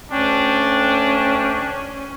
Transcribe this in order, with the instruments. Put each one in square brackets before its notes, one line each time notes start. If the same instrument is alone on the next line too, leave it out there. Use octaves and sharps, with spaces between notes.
[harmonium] D2 G5 [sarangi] C#4 [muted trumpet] D4